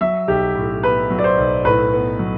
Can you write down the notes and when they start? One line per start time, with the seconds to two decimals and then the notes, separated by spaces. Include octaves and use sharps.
0.01 F#3 E5
0.28 B1 G4
0.55 A2
0.83 B3 B4
1.10 F#3
1.19 D5
1.24 C5
1.38 B1
1.65 A2 B4
1.93 B3
2.19 F#3